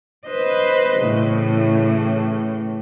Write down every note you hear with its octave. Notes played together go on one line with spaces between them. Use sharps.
B4 C5 D#5
A2 C#3 E3